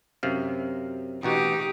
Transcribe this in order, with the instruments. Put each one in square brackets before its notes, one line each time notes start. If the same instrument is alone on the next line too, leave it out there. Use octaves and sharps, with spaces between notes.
[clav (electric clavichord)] F#2 C3 F5
[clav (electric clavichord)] A1 B2 F#4 [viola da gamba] D#4 G4